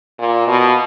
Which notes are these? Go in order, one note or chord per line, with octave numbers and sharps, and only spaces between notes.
A#2
B2